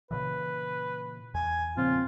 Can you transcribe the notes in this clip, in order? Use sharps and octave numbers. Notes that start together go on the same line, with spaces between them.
A#2 C#3 E3 B4
E2 G#5
A#2 C#3 F3 C4 F4